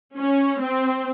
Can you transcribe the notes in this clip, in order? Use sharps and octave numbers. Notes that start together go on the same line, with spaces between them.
C#4
C4